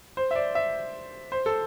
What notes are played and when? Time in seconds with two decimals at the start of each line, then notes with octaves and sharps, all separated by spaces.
0.17 C5
0.31 E5
0.36 D5
0.55 E5
1.32 C5
1.46 A4